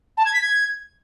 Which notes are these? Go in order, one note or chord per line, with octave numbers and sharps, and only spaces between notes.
A5
G#6
B6
G#6